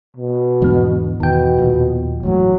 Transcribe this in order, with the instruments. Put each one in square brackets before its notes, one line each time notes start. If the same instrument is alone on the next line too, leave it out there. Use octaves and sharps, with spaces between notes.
[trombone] B2
[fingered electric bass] E2 D3 E3 [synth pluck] G#2 B3
[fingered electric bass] E2 [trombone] B2 [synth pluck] D#3 G5
[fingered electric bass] D#2 A#2 F3
[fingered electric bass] G1 A2 E3 [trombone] F#3